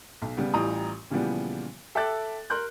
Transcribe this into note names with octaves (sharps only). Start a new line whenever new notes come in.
B1
C#3 G3 B3
A1 E3 G3 F4 A#5 D#6
A#2 C#3 E3 F3 G3 B3
A4 E5 G5 D6 F#6 A6
A#4 C6 F#6 G6